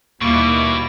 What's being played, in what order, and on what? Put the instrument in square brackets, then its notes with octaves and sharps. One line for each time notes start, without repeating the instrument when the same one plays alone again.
[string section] D#2 G3 E4 [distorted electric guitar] B2 [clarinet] A#3 [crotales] C#6 D7